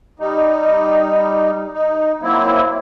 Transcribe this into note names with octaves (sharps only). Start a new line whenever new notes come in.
G3 D#4
D#4
F#3 A#3 C4 E4